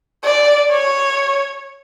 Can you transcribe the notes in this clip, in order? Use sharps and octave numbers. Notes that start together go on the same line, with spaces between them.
D5
C#5